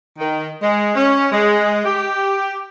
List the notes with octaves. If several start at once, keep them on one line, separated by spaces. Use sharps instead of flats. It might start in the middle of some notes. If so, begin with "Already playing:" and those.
D#3
G#3
C#4
G#3
G4